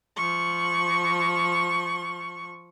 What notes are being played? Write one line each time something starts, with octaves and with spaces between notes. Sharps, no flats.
F3 C#6